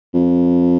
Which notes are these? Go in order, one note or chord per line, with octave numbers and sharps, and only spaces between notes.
F2